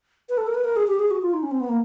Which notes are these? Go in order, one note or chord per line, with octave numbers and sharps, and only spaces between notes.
B4
A4
A#4
B4
A#4
G#4
G4
G#4
F#4
F4
D#4
C#4
C4
B3
A#3